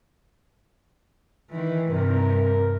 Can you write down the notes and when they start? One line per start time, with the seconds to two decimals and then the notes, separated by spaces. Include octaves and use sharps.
1.51 D#3 E3
1.89 G2 C3 A#4